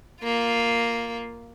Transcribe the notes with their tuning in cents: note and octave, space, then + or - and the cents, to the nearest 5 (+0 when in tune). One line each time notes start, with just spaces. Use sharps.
A#3 +0 F4 +0